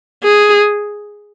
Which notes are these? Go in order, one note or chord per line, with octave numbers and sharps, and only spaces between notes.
G#4